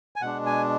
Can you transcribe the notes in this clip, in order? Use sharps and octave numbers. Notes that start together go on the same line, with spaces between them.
G#5
B2 G#3 D4 F#5
G#5